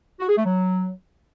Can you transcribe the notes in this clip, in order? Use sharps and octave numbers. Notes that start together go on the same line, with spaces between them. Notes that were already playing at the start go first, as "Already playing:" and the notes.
F#4
G#4
A3
F#3